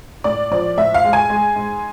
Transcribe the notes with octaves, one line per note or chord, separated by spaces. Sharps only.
A2 D5
F3 D5
A2 E5
F5
G#3
G#5
G#3
G#2